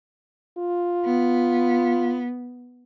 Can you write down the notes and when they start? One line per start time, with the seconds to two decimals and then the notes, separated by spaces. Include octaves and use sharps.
0.57 F4
1.06 B3